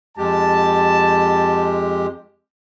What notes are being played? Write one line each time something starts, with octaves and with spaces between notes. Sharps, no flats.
F2 G#3 G4 A5